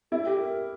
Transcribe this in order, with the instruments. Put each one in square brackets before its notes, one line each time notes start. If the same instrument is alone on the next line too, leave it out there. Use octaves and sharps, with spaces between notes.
[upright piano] E4 [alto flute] A4
[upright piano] G4
[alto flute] A#4